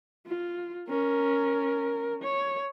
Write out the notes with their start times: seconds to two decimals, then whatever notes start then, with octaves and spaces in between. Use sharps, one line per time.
0.27 F4
0.89 C#4 A#4
2.22 C#5